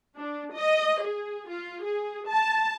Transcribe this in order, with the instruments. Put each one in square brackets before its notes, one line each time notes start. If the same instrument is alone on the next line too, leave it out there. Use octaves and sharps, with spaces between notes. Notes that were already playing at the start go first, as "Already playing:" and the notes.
[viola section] D4
D#5
G#4
F4
G#4
A5